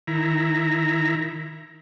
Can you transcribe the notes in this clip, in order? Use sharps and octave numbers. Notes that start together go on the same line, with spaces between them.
D#3 E4 A#5